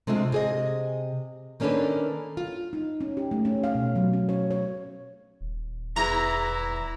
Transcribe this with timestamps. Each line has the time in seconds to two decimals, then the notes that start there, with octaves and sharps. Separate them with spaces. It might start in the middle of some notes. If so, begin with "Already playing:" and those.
0.07 C3 G#3 A3 D4 F4
0.32 C3 G#4 D#5
1.60 D#3 A#3 C#4 D4 A4 B4
2.37 F4
2.73 D#4
3.01 C#4
3.17 G4
3.31 A3
3.45 C#4
3.64 F5
3.75 B2
3.96 F#3
4.13 C#4
4.29 C#5
4.51 C#5
5.41 D#1
5.96 E2 E4 A#5